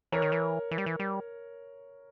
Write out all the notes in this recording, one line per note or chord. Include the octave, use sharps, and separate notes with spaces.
E3 A#4 C#5
D#3
E3
E3
G3
E3
G3